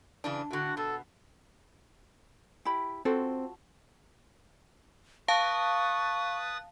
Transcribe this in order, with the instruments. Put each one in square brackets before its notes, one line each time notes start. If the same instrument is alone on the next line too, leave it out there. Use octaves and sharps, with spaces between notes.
[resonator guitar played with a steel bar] C#3 E3 D4
[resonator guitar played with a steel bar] A2 D3 [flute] F#4
[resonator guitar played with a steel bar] B2 [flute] A4
[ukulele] E4 G4 B5
[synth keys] C4 [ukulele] F4 F#4 A4
[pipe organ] B4 D#6 A6 [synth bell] F5 A5 [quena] C#6